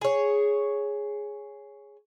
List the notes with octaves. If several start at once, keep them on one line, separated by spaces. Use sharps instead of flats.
G#4 C#5